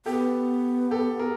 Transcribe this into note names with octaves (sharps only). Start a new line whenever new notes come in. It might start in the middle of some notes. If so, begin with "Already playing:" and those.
B3 G4 A4
G4 A4
G#4 A#4